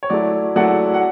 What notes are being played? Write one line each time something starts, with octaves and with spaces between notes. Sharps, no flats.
C#5
F#3 A3 E4 D5
F#3 A3 E4 D5 F#5
F#5